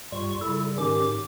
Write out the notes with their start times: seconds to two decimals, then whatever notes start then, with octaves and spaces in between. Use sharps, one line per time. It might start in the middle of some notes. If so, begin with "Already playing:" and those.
0.12 G2 G3 F4 C#6
0.41 C#3 G3 E4 A4
0.78 G#2 D#3 C#4 G4 D6